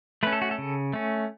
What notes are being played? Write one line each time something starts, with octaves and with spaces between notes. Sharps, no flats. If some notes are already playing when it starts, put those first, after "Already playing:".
A3 C#4 B4
A4
F#4
A4
C#3
A3 C#4